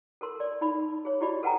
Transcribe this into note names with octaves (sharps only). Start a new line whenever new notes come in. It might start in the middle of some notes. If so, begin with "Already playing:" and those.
A4 A#4 C6
D5
D#4 D5 B5
G#4 C#5
E4 F#4 G4 D5 D#5 B5
A4 B4 F#5 G5 A5 A#5